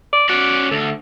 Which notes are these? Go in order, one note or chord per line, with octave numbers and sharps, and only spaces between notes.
D5
C#4 F#4 D5
D2 A4